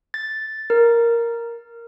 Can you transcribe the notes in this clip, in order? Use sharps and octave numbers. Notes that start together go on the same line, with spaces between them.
A6
A#4